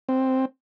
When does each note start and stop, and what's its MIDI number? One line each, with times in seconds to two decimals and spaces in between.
0.09 0.45 60